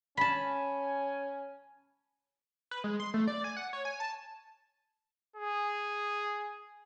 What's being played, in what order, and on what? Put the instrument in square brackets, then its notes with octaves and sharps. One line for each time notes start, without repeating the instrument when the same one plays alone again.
[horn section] C#4 G#5 [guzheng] A5 B5
[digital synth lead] B4
G#3
C6
A3
D5
G#5
F#5
C#5
G#5
A5
[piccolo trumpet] G#4